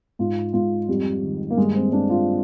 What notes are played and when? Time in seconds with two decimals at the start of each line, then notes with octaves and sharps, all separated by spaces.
0.19 G#2 F4
0.53 G#2 F4
0.89 F2 G3
1.23 D#3
1.51 A#3
1.57 G2 G#3
1.75 C4
1.92 G2 D4
2.10 F4